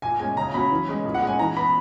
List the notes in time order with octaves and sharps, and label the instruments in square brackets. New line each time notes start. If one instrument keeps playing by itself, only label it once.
[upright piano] A#2 G#5
G#3 C#4 G#5
C#3 A#5
F#3 C#4 B5
E3
G#3 C#4
A#2
F#5
G#3 C#4 G#5
E3 A#5
B3 B5